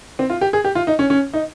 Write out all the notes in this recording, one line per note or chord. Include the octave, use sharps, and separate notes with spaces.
C4
F4
G4
G#4
G4
F4
D#4
C#4
C#4
D#4